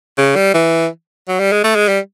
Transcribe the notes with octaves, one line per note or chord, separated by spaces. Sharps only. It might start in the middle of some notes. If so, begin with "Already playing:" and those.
C#3
G3
E3
F#3
G3
G#3
A3
G#3
G3